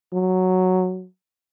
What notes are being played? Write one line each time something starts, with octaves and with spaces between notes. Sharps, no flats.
F#3